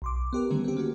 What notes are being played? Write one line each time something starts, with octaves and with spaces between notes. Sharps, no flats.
B1 C6 D6
B3 G4 A#4
D3 D#3 G3 A3 C#4
C4 G4
A#3 C#4 F#4